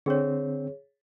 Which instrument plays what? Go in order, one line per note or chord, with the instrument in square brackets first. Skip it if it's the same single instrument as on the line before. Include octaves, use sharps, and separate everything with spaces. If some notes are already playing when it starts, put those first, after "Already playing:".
[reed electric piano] D3 C4 [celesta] G#4 C#5